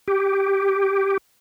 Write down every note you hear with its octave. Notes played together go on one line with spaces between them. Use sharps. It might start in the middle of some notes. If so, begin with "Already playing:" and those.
G4